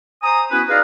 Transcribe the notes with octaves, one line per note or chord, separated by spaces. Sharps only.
C5 G#5 A#5 D#6
B3 C#4 E4 F#4 B4
D#4 G#4 B4 D5 D#5 F5